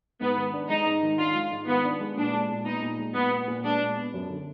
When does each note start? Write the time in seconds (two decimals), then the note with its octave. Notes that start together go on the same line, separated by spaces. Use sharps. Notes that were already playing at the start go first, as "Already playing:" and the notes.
0.21 G#2 B3
0.37 D#3
0.54 D4
0.69 G#3 D#4
0.86 G#2
1.03 D#3
1.18 D4 F4
1.35 G#3
1.52 G#2
1.67 D#3 B3
1.85 D4
2.00 G#3
2.17 A#2 D4
2.33 G#3
2.50 A#2
2.66 B3 D#4
2.82 A#2
2.98 G#3
3.15 A#2 B3
3.31 B3
3.48 A#2
3.64 G#3 D4
3.80 A#2
3.97 B3
4.14 F#2
4.29 D3